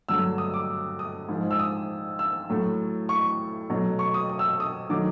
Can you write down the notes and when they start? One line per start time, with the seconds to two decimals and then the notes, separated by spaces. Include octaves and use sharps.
0.09 G2 D3 F#3 A3 E6
0.38 D#6
0.54 D6
0.99 D#6
1.29 G#2 F3 G#3
1.51 E6
1.59 D#6
2.19 E6
2.50 A2 F#3 A3
3.09 C#6
3.70 B2 F#3 A3
3.99 C#6
4.14 D#6
4.29 D#6
4.39 E6
4.50 E6
4.60 D#6
4.90 D#3 F#3 A3 D6